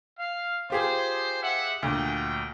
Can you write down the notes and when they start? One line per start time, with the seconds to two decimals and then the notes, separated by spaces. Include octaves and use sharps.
0.18 F5
0.70 F4 G4 G#4 C5
1.41 E5 F#5
1.83 D2 A#2 F#4 G5